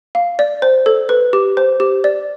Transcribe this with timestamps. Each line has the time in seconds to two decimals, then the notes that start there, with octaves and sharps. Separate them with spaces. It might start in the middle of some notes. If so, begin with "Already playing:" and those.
0.15 F5
0.39 D5
0.62 C5
0.86 A4
1.09 B4
1.33 G4
1.57 C5
1.80 G4
2.04 D5